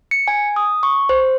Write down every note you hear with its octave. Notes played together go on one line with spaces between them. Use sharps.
C#7
G#5
D#6
C#6
C5